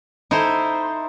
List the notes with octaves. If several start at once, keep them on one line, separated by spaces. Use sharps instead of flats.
D#4 E4 A4 C5